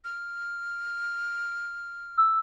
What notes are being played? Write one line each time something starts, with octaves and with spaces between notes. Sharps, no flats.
F6
E6